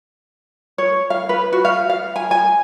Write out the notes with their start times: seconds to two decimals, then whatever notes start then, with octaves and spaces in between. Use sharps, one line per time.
0.78 C#5
1.10 F5
1.29 B4
1.52 F#4
1.65 F5
1.89 F5
2.16 G#5
2.31 G#5